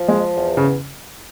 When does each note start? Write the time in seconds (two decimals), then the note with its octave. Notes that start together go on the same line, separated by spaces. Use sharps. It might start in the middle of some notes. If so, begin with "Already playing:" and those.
Already playing: F3
0.08 G#3
0.36 E2
0.57 C#3